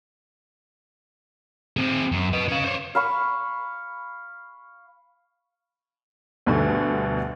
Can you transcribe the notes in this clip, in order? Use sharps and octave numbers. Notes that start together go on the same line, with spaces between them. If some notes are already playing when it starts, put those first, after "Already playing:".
C4 G#4
F#2
B4 D#5
C#4 F5
C5 C#5
F5 B5 C#6
D2 G2 B2 D3